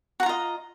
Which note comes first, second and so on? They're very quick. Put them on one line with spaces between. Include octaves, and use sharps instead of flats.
F#4 A#5 F4 D#5